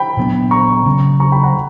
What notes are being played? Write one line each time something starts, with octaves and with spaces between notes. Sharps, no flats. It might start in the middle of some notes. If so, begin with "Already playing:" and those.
Already playing: G5 B5
A#2 F#3 B3 D4
A#5 C#6
C#3 F#3 C#4
A#5 C#6
G5 B5
F#5 A#5